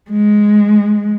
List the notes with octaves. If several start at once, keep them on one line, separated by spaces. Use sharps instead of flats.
G#3